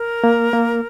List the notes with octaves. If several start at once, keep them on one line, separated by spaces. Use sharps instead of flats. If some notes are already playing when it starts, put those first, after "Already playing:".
Already playing: A#4
A#3
A#3